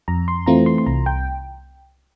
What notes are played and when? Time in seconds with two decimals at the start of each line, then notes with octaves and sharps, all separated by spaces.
0.08 F2 A#5
0.28 C6
0.46 E3 A3 C4 F4 A#5
0.66 C6
0.78 C6
0.86 C2 A#5
1.06 G5